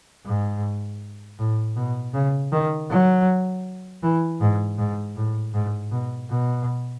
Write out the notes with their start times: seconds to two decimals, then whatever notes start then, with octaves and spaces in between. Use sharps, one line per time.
0.25 G#2
1.39 A2
1.76 B2
2.14 C#3
2.52 D#3
2.90 F#3
4.02 E3
4.41 G#2
4.78 G#2
5.16 A2
5.54 G#2
5.91 B2
6.29 B2